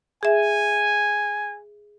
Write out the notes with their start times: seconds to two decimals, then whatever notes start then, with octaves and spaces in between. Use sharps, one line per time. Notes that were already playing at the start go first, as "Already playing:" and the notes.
0.23 G#4 E5 G#5